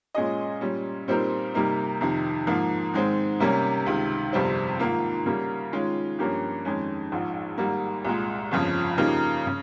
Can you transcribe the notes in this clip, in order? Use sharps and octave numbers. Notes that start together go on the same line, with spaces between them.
A#2 G#3 C#4 G#4 D#5
A#2 G3 C#4
A#2 G3 C4 D#4 A#4
C3 G3 A#3 D#4
F2 C3 D#3
G#2 F3 A#3
G#2 D#3 G#3 C4
C3 G3 A#3 C#4
C#2 C3 D#3
G1 F2 C3 G3 C4
G#2 D#3 A#3 F4
C#3 G3 A#3
D#3 G#3 C#4 F4
G2 F3 A#3 C#4 G4
F2 D#3 G#3 C#4
A#1 G#2 F3
G#1 G#2 G3 A#3
C2 A#2 G#3
G1 F2 C#3 F3
C#3 F3 A#3 D#4 G4
C#3